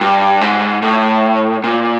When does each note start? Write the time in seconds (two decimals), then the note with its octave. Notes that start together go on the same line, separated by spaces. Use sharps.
0.01 G2
0.41 G#2
0.82 A2
1.64 A#2